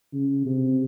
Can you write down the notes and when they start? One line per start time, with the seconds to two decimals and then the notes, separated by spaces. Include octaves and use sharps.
0.13 C#3
0.45 C3